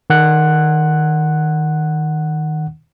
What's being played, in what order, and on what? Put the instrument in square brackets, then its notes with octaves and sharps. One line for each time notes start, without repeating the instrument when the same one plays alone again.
[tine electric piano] D#3 F#5 F#6